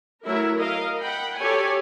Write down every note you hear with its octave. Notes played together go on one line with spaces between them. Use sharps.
F#3 A3 E4 A#4 E5
A#4 D#5 F5
F#5 G5 B5
G4 A4 C#5 D5 G#5